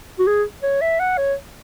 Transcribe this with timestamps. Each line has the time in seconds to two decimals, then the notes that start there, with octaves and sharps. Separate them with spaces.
0.19 F#4
0.27 G#4
0.63 C#5
0.82 E5
1.00 F#5
1.18 C#5